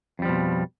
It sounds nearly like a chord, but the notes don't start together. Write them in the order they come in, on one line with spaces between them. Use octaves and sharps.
F2 G3 F3 B2